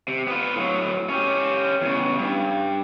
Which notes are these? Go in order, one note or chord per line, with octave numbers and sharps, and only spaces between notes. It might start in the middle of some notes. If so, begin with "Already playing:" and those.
C3
B3 F4
A2 F#3
C#4 G4
E2 C#3
G2